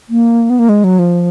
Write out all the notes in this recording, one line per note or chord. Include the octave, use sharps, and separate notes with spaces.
A#3
B3
A#3
G#3
F#3
F3